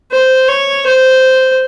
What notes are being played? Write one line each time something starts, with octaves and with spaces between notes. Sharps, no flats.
C5
C#5
C5